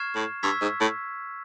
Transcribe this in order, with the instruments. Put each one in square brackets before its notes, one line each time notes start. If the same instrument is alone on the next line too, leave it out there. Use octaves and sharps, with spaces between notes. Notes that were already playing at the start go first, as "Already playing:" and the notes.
Already playing: [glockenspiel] C#6 F6 G#6 C7 E7
[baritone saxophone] A2
[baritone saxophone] G2 [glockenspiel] C#6 E6 G#6 B6
[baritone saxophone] G#2
A2